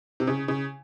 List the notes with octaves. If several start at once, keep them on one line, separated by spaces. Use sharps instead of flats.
C3
C#3
C#3